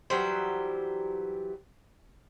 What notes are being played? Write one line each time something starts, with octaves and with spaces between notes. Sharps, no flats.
E3 F#3 G3 C5